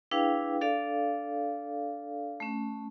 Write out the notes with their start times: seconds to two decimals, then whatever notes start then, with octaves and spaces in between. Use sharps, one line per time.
0.11 D4 E4 G#4 B4 F5 G5
0.61 D4 A4 D5 F5
2.40 A3 C#4